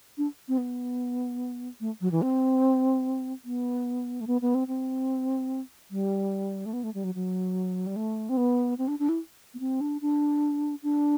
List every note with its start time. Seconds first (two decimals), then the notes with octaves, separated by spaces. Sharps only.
0.18 D4
0.48 C4
0.58 B3
1.81 A3
2.01 F#3
2.11 E3
2.22 C4
3.45 B3
4.21 A3
4.27 B3
4.41 B3
4.55 C4
4.68 C4
5.91 G3
6.66 A3
6.73 B3
6.83 A3
6.94 G3
7.04 F#3
7.15 F#3
7.87 G3
7.96 A3
8.29 C4
8.37 B3
8.78 C4
8.88 D4
8.99 D4
9.09 E4
9.54 B3
9.60 C4
9.81 D4
10.01 D4
10.83 D4